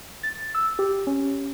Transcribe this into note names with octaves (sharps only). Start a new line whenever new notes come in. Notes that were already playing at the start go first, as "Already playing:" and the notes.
A6
E6
G4
C#4